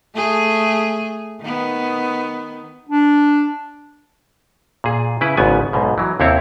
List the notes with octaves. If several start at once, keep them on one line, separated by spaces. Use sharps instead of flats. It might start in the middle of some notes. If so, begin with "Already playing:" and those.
A3 G#4
D#3 B3
D4
A#2 G#4
C#3 E4 B4
G#1 G#2 C#3 B3 G#5
B1 G#2 B2
E3 F#3
D#2 C3 C4 E4 C#5